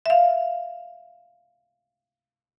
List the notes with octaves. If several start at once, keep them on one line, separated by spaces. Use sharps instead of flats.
E5 F5